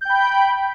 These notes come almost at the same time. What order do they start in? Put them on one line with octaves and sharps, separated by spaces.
G6 G5 B5